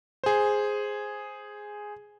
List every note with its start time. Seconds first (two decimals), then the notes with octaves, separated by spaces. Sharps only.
0.24 G#4 C5